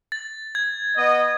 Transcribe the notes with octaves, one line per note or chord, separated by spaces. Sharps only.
A6
G#6
B3 D#5